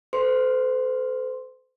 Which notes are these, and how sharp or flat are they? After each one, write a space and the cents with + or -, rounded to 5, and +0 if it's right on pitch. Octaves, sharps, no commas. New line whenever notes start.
A4 +0 C5 -40 C6 +5